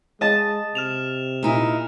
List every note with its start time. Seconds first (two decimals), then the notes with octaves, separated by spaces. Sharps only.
0.21 G#3 D#5 A5
0.75 C3 F6 E7 F7
1.43 A#2 D#4 E4